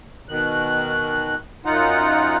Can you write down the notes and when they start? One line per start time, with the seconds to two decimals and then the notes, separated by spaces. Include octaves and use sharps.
0.29 B2 D#3 F#6
1.65 F#2 D#4 F4 F#5